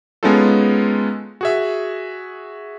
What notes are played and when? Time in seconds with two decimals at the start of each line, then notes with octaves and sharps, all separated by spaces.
0.23 G#3 B3 C#4 D#4 F4 A4
1.41 F#4 G#4 E5